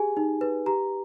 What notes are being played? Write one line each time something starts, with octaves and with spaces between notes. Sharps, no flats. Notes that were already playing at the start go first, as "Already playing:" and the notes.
Already playing: G4 G#4 G#5
D#4
B4
G4 A#5